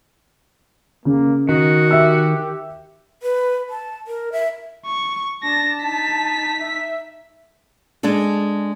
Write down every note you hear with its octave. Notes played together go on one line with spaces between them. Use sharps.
C#3 A#3
D#3 F#4 D#5
G4 E5 E6
B4
A5
A#4
E5
C#6
D4 A5 A#6
D#4 B6
E5
G#3 D4 G#4 A4